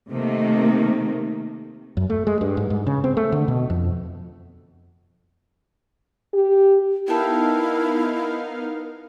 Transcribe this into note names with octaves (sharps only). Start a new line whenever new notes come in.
C3 D#3 A3 A#3
F#2
A3
G#3
G2
G#2
G#2
C#3
C4
A3
D3
B2
F2
G4
B3 D#4 E4 A4 A#4 F5 G5